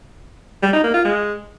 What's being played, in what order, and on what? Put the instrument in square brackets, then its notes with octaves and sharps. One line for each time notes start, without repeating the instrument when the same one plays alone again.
[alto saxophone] G3
D#4
A#3
F4
G#3